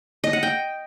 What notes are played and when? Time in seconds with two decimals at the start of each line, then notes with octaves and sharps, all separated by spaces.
0.24 D#5
0.33 F#5
0.43 G5